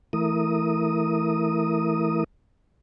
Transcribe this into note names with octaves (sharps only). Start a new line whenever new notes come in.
E3 A3 E4 A#4 D#6